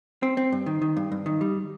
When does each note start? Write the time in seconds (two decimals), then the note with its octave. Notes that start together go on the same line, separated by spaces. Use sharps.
0.23 C4
0.37 C4
0.52 G2
0.66 D#3
0.82 D#3
0.97 G2
1.12 G2
1.26 D#3
1.41 G3